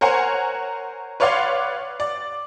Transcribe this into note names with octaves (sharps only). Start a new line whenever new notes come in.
A#4 C5 C#5 F#5 G#5
B4 C#5 D5 F5 F#5 C6
D5